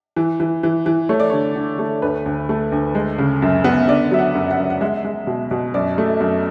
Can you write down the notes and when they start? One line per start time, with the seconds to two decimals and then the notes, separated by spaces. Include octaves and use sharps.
0.16 E3
0.40 E3
0.63 E3
0.86 E3
1.09 A3 C#5
1.20 D5
1.30 D3 C#5
1.56 D3
1.79 A3
2.02 D2 B4
2.26 D2
2.49 A3
2.72 D2
2.95 G#3
3.18 C#3
3.42 F#2
3.64 B3
3.88 D3 D5
4.11 F#3 E5
4.19 F#5
4.35 F#2
4.51 F#5
4.58 F#2
4.70 F#5
4.81 G#3 E5
5.04 G#3
5.27 B2
5.51 B2
5.74 F#2 D5
5.98 A3
6.20 F#2